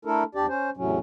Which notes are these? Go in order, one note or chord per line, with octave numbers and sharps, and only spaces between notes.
A3 D4 E4 A4 A#4
E2 D4 G4 D5
C#4 C5
E2 A2 C3 F#3 C#4